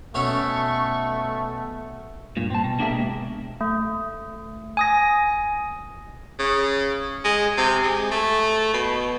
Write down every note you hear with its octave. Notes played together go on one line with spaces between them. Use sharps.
B2 A3 C#4 E4 C#6
G2 A#2
C4 A5
B2
A#3 D4 G4 G#4 A#4 E5
B2 G#3
A3
G#5 D#6 A#6
C#3
G#3
C3
G#3
A3
B2